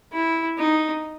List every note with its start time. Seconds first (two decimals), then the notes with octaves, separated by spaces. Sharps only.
0.13 E4
0.58 D#4